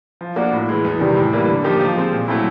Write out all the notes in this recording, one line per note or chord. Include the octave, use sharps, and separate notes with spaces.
F3
A#3 D4 F#4 A#4
A2
E3 G#3
E2
C3 D#3 G3
A2
E3 G3 A#3
D3
F3 A#3 D#4 G4
F3
G#3 C4
A#2
F#3 A3 C4 E4